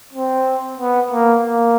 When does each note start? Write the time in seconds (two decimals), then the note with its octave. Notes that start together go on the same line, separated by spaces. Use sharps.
0.13 C4
0.78 B3
1.11 A#3
1.43 A#3